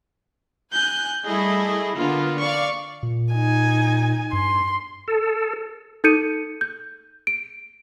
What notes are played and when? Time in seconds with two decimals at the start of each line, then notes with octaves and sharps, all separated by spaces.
0.73 G#5 F#6 G6
1.25 G3 A3 E4 G#4 D#5
1.96 D3 A#3 B3 D4 F4
2.40 D5 F5 C#6
3.03 A#2
3.33 D#4 G#5
4.33 G2 C6
5.08 A4
6.04 D#4 A4 G6 C#7 D#7
6.61 G6
7.27 D7